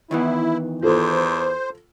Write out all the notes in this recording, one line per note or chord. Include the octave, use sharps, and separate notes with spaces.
D#3 E3 B3 E4
E2 F4 A4 C5